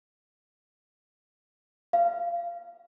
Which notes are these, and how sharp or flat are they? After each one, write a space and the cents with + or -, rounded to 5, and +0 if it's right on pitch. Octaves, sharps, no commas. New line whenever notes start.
F5 -20